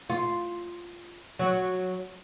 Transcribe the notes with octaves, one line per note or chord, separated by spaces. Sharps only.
F4
F#3